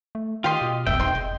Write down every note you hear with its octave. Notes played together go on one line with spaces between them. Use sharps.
A3
D#3 F4 G4 D#5 G5 C6
B2
B1 F2 C4 E5 G5
F2 C3 D#3 F4 C6
F1 G#3